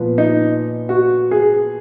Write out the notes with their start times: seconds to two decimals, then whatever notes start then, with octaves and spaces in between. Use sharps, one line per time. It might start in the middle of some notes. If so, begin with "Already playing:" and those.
Already playing: A#2 F3 B3
0.18 D#4
0.89 F#4
1.31 G#4